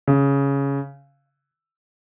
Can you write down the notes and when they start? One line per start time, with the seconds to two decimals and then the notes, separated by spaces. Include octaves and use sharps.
0.07 C#3